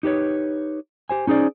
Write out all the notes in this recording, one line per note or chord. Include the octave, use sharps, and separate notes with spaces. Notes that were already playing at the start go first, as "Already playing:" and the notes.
D#4 G4 B4 C#5
G4 C5 G#5
C#4 D#4 G#4 C5 D5